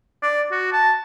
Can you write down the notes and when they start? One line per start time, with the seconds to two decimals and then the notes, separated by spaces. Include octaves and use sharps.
0.22 D5
0.51 F#4
0.72 A5